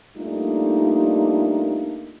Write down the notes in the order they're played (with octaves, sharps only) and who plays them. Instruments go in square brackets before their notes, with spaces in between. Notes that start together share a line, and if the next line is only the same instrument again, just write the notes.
[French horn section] G3 A3 A#3 D4 D#4 F4